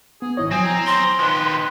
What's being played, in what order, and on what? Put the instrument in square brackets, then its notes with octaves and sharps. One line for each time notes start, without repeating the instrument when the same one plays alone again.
[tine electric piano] B3 [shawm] G#4
[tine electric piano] G#1 E4 C#5 [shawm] D#5
[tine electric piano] F3 F#3 [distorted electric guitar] C4 [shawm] G#5
[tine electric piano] G#5 [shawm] A#5
[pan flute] C6
[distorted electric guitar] D#3 F3 [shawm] B4